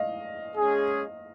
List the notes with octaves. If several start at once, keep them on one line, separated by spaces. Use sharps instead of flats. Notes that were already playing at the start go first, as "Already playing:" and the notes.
Already playing: D#5 F5
G#3 C#4 G#4